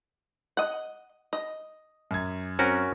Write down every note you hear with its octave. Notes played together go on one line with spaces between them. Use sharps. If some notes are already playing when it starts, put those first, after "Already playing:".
D#5 F#5
D#5
F#2 G#6
C4 C#4 F#4 A#4